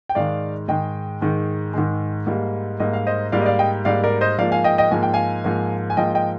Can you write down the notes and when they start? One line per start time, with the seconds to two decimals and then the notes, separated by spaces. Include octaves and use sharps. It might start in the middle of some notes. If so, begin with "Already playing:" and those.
0.09 G5
0.15 G#2 D#3 G#3 D5 F5
0.68 G#2 D#3 G#3 D#5 G5
1.21 G#2 D#3 G#3
1.74 G#2 D#3 G#3
2.27 G#2 G3 A#3
2.80 G#2 G3 A#3 D#5
2.93 F5
3.07 C5 D#5
3.32 G#2 G3 A#3 D5 F5
3.42 D#5
3.46 D5 F5
3.59 D#5 G5
3.85 G#2 G3 A#3 D5 F5
4.04 A#4 D5
4.21 C5 D#5
4.38 G#2 F3 A#3 D5 F5
4.52 F5 G#5
4.64 D#5 G5
4.78 D#5 G5
4.91 G#2 F3 A#3 G#5
5.03 G5
5.14 F5 G#5
5.44 G#2 F3 A#3
5.90 G#5
5.97 G#2 F3 A#3 D#5 G5
6.15 D#5 G5